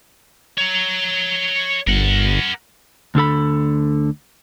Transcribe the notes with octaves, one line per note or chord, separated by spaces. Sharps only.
C#5 A#5
G1 A#4 F#5
D2 D3 A4 B5